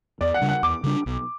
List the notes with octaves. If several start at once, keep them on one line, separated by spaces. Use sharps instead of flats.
E2 D5
F#5
C#3 G3 D4
F#5
E2 D6
C#3 G3 D4
B1